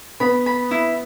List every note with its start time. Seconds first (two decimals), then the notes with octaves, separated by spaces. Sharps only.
0.20 B3 B5
0.46 B5
0.71 E4